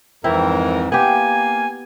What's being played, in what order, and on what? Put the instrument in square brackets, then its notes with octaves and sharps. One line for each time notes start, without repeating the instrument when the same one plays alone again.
[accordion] F2 G#2 E3 [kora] C4 E4 [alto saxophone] A#4
[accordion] A#3 [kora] B3 G4 [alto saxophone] G#5